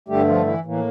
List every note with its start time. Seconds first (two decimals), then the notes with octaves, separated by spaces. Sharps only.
0.08 G2 D3 G3 A3 G4
0.28 F3 F4
0.46 E3 E4
0.65 A2 E3 A#3